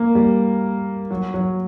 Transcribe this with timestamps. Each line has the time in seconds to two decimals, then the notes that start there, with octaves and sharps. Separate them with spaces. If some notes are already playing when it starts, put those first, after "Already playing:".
Already playing: A#3
0.15 G3
1.11 F#3
1.34 F#3